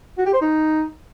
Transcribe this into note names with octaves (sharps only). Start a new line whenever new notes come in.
F#4
G4
C5
D#4